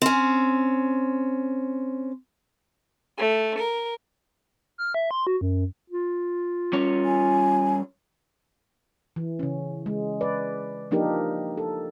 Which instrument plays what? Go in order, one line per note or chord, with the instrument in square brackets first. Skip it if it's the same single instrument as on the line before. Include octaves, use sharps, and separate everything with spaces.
[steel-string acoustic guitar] C4 C#4
[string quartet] A3
A#4
[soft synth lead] F6
E5
C6
F#4
F#2
[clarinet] F4
[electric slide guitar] G3 C#4 C#5
[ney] G#5
[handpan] E3
C#3 C#4
G#3
B4 D5
F3 A#3 D4 D#4 G4 A#4
A4